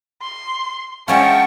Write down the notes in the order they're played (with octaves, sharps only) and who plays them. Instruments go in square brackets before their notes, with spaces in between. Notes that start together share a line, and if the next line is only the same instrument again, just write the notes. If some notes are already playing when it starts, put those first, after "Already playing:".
[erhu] C6
[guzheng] G#3 C#4 F4 [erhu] E5 [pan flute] F#5 [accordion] G5 A5 C#6